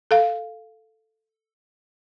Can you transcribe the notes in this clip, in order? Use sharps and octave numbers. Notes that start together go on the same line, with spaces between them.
A4 F5